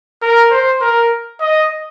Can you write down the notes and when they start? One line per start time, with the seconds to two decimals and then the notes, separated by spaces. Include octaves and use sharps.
0.22 A#4
0.51 C5
0.81 A#4
1.40 D#5